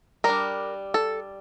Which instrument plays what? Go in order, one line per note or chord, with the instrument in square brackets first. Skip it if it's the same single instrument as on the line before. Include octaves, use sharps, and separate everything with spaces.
[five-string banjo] G3 D4 A#4
A4